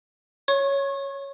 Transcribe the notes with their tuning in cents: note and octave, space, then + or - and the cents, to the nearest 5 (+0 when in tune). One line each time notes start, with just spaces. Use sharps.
C#5 +0 C#6 -30